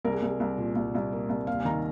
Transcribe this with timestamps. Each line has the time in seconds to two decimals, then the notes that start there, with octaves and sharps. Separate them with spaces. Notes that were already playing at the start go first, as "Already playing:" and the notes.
0.05 C2 A#4
0.12 G#4
0.22 C2 G#4
0.40 C2
0.58 A#2
0.76 C2
0.95 C2
1.12 A#3
1.29 C2
1.47 D#2 F5
1.60 G#5
1.65 D#3 A#5